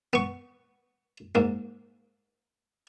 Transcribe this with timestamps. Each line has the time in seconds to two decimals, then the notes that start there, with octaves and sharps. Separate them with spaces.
0.13 B3 C#6
1.35 G#2 A#3